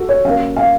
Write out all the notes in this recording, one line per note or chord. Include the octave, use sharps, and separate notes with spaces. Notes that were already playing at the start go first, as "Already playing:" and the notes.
Already playing: F#4 A4
C#5
C#3 F#3 A#3 F5
F5